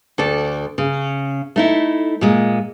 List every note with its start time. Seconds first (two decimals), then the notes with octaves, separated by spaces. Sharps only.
0.18 D2 A4 D5
0.78 C#3
1.56 A3 D#4 E4
2.21 A#2 G#3